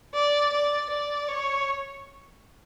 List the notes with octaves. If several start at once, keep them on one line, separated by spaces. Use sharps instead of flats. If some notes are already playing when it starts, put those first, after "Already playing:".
D5
D5
D5
C#5